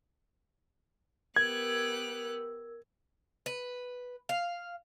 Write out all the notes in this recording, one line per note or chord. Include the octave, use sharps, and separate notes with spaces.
B3 G4 A#4 E6 F#6 G#6
B4
F5